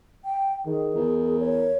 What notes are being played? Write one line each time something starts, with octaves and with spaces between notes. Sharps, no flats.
G5
D#3 G#4
E2 A#4
C#5